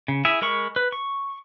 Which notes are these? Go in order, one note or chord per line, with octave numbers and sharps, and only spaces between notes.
C#3
E4 G#4 E5
G#3 A#4 B5 C#6
B4
C#6